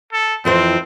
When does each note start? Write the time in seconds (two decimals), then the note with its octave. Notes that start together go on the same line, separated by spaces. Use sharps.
0.13 A4
0.45 F2 E3 C4 C5